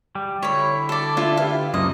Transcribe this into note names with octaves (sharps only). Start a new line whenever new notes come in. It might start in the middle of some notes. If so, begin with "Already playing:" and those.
G3 G5
D3 E4 C#5 B5
A4 D5
D4 F4 A4 E5
G4 B4 E5 F5
C#2 F#2 F3 A#3 D#4 D#5